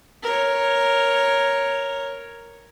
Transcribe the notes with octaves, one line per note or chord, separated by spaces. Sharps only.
A#4 C#5